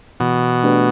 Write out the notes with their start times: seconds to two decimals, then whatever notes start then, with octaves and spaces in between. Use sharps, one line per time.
0.20 B2 E3
0.63 A3 D4 G4 B4